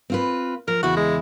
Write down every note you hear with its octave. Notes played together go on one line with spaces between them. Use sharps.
C4 F4 B4
F3 A#4
E2 C#3 E4 F#4
G#3